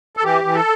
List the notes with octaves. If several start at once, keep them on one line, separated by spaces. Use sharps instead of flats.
A4
E3 G4
E3
A4